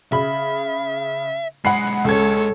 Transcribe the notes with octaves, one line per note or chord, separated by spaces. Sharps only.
C#3 E5 B5
B1 G#3 F#5 B5 C7
C#2 A4 C#5 G#6